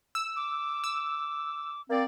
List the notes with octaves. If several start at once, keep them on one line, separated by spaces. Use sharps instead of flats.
E6
D6
E6
A#3 C4 D5